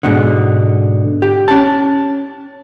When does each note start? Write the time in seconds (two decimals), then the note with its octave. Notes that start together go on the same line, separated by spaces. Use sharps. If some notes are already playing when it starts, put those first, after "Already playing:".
0.03 G#2 B2 D3
1.22 G4
1.48 C#4 A5